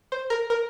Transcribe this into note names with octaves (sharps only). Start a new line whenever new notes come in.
C5
A#4
A#4